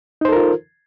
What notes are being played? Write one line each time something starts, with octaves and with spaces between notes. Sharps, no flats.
D#4 F4 A4 A#4 C5